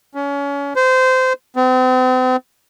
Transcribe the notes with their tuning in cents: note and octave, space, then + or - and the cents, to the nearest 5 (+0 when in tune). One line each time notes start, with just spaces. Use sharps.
C#4 +30
C5 -20
C4 -40